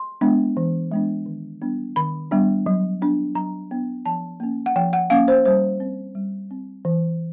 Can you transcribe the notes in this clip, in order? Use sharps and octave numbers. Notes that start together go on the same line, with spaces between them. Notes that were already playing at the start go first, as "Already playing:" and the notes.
Already playing: C6
G#3 B3 D4
E3
G#3 B3 D4
D#3
G3 B3 D4
D#3 B5
G3 B3 D4
F#3
B3 D4
F#3 A#5
B3 D4
F3 A5
A#3 C#4
F#5
F3 G5
F#5
A#3 C#4 F5
C5
G3 C5
C4
G3
C4
E3